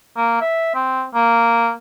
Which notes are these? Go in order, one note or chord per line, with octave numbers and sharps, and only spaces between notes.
A#3
E5
C4
A#3